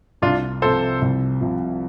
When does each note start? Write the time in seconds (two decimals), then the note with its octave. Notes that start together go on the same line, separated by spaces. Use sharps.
0.22 C2 D4 F4
0.62 C3 F3 A4 C5
1.01 C2
1.41 C3 F3